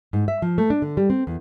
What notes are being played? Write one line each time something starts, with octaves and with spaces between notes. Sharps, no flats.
G#2
E5
F3
A3
D4
D3
G3
C4
E2